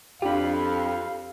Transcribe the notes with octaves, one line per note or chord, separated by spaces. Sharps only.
F2 D4 F4 G4 F5 B5